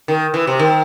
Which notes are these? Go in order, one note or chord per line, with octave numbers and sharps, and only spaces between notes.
D#3
E3
C3
D#3